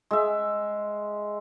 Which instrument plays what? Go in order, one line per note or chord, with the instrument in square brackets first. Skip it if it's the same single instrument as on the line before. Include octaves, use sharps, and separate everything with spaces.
[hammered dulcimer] G#3 E5